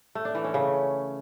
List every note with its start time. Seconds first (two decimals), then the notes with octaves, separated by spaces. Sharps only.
0.15 A3
0.25 D4
0.35 E3
0.44 C#4
0.54 C#3